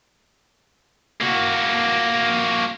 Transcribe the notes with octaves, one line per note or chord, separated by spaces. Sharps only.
A#3 F#4